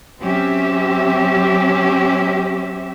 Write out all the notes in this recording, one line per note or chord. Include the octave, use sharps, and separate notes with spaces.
F#3 C4 C#4 G4 E5